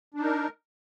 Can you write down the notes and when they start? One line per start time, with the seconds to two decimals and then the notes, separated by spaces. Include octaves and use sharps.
0.14 D4
0.19 D#4
0.23 A#4